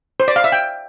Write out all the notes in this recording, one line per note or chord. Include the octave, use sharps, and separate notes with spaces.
C5
D5
F5
E5
G5